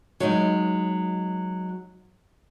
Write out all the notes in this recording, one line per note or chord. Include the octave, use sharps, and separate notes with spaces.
F#3 G#3 D#4